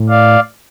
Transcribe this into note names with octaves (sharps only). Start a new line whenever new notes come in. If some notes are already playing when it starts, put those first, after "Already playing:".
Already playing: A2
D5 F5